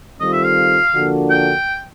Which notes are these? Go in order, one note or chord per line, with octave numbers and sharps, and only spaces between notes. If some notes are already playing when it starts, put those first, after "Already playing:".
D#3 G3 C4 F4 A4 D#5
E5
F5
D3 F3 A#3 D4 F#4
G5